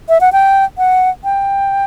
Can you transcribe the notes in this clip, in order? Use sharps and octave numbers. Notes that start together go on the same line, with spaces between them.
E5
F#5
G5
F#5
G5